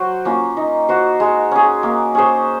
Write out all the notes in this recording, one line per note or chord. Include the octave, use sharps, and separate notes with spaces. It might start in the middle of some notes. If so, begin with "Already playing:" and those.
Already playing: F#3 F#4 C5
A#3 C#4 F4
D#4
F#4 C5
G#3
C#4 G#4
A#3
C#4 G#4 C5